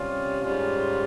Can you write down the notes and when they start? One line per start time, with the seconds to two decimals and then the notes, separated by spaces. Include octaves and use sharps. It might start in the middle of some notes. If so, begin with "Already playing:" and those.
Already playing: C3 G3 C#4 F4
0.43 G#2 G3 C#4 F4